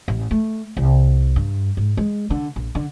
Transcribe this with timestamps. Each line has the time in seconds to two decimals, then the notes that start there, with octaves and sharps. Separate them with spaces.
0.08 A1
0.31 A3
0.77 C2
1.36 G2
1.77 G#2
1.97 G#3
2.30 D3
2.56 A#1
2.75 D3